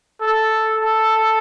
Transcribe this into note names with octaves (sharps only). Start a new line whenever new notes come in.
A4
A4